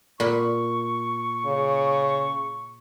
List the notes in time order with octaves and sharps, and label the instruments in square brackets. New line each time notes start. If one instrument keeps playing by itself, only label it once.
[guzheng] A#2 B5 [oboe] C#6
[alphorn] C#3